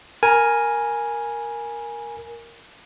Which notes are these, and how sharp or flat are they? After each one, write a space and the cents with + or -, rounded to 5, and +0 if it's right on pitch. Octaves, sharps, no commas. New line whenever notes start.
A#4 +0 G#5 +0 B5 -45